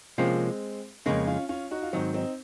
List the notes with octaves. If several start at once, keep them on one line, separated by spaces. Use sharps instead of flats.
C3 F3 G#3 A#3 C4 C#4 F4
F2 C#3 G#3 A#3 C#4
C#4 F4
C#4 F4
D#4 F#4
F4
G#2 D#3 F#3 C4 D#4
C4 D#4